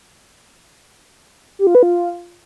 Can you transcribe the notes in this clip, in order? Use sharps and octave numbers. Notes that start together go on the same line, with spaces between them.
G4
F4
B4
F4